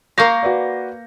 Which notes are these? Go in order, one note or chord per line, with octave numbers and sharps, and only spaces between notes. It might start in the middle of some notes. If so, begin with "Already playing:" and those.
A#3 F5 C#6 G6 A#6
F#4 B4 D5